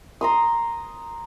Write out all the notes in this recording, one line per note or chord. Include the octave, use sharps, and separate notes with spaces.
A#5 C6 D#6